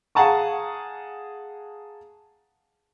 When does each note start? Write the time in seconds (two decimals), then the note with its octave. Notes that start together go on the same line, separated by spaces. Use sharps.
0.15 G#4 F5 F#5 A5 A#5 C#6